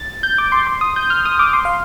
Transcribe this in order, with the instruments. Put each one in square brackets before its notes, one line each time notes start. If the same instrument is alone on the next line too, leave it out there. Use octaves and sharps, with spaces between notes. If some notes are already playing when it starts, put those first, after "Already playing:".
Already playing: [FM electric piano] A6
G6
D6
C6
C6
D#6
G6
F6
D#6
D6
C6
F5